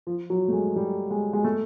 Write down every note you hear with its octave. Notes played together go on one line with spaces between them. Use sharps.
F3
F#3
A3
G#3
G3
G#3
G#3
A3